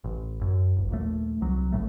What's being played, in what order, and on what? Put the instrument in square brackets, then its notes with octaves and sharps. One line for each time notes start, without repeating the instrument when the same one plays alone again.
[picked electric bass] A1
F#2
D1 G1
A#1 D#2 A3
C2 F#3
G#1 E2 A2 A3